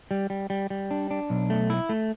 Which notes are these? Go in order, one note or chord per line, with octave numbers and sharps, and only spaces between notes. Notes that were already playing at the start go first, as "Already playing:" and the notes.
G3
G3
G3
G3
D4
D4
B1
A3
E4
A3